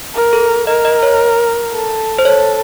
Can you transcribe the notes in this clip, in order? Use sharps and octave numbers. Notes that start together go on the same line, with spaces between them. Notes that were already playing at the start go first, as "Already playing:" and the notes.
A#4
A4
A#4 D#5
D#5
C#5
A4
C5
A4 C#5